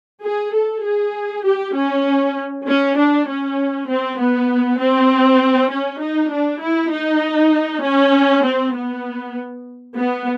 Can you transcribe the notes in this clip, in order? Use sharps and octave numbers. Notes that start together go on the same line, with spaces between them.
G#4
A4
G#4
G4
C#4
C#4
D4
C#4
C4
B3
C4
C#4
D#4
D4
E4
D#4
C#4
C4
B3
B3